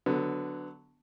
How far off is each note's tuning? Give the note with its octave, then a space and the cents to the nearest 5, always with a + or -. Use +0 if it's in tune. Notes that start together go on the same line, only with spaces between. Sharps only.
D3 +0 F#3 +0 B3 +15